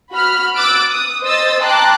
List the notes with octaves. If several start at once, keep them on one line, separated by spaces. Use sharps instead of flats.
F#4 B5 F6
D6 E6 F#6 A6 D7
D#6
C5 D#5 D#6 E6 A6
G5 A5 A#5 C6 D6 F#6